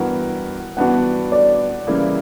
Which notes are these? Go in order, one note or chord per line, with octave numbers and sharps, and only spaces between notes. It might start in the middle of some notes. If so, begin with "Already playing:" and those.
Already playing: G2 E3 B3 F#4 A#4 F#5
G2 E3 B3 D4 F#4 F#5
D5
C#3 E3 G3 A#3 E4